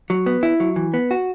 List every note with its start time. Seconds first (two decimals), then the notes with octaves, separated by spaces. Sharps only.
0.10 F#3
0.26 B3
0.43 E4
0.60 F#3
0.76 E3
0.94 B3
1.11 F#4